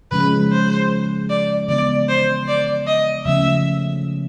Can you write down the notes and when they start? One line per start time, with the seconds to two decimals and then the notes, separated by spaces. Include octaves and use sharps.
0.11 C#3 F3 G#3 C#4 B4
0.51 C5
1.29 D5
1.68 C#3 E3 G#3 B3 D4 D5
2.08 C5
2.48 D5
2.87 D#5
3.25 C#3 F3 A3 C#4 E5